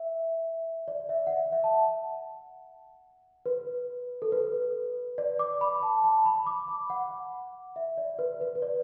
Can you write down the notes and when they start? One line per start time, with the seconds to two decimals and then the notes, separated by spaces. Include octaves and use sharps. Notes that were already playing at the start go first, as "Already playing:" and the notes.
Already playing: E5
0.88 D5
1.09 E5
1.27 F#5
1.30 E5
1.52 E5
1.64 A5
1.74 F#5
3.46 B4
4.22 A4
4.32 B4
5.18 D5
5.39 D6
5.61 B5
5.83 A5
6.04 A5
6.26 B5
6.47 D6
6.68 B5
6.90 F#5
7.76 E5
7.98 D5
8.19 B4
8.41 B4
8.56 B4
8.62 D5